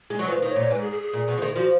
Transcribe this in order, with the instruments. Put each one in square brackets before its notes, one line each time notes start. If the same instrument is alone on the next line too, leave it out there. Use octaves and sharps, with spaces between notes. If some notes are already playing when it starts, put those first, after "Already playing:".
[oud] G#3
F#3
[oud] F3 [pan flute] B4
[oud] D#3
[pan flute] C#5
[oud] A#2
[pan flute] C#5
[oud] G#2 [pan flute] B4
[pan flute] G#4
G#4
G#4
[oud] A#2
B2
F3
D#3
[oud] F3 [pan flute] F#4